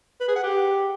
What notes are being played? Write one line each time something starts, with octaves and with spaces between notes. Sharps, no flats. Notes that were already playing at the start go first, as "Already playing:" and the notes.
B4
G#4
F#5
G4